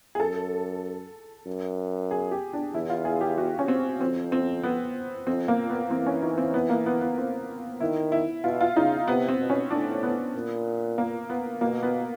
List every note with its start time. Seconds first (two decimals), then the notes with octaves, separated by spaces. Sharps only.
0.15 G#4
0.20 F#2 A4
1.47 F#2
2.11 G#4
2.32 G4
2.53 D4
2.74 E2 E4
2.90 F4
3.05 G#4
3.21 G4
3.38 F#4
3.59 C#4
3.68 C4
4.01 F2 C4
4.32 C4
4.63 B3
5.27 F2 C4
5.48 A#3
5.59 A#2
5.70 B3
5.90 E3 C4
6.07 C#4
6.22 D#4
6.38 C4
6.54 B3
6.69 A#3
6.86 B3
7.01 B3
7.18 C4
7.80 D#3 E4
8.12 E4
8.44 B2 F4
8.61 F4
8.76 C#3 D#4
9.08 C3 B3
9.29 C4
9.39 B2
9.50 C#4
9.70 A2 D4
10.03 B3
10.35 A#2
10.98 A#3
11.29 B3
11.61 B2 A#3
11.83 B3